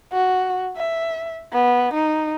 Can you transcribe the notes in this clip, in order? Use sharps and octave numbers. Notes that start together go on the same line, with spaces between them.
F#4
E5
B3
D#4